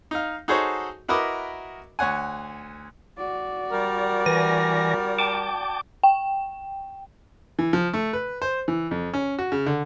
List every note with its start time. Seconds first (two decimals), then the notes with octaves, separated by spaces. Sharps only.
0.11 D#4 F5
0.48 D#4 F#4 G#4 A4 C5 C#5
1.09 E4 F#4 A#4 B4 D#5 D6
1.99 D2 C#5 F#5 G#5
3.18 F#4 D5
3.72 G3 A#4
4.26 E3 G#5 A#6
5.19 G5 A5 D6
6.03 G5
7.59 E3
7.73 F3
7.93 A3
8.13 B4
8.42 C5
8.68 E3
8.91 F2
9.14 C#4
9.39 F#4
9.52 C#3
9.66 D3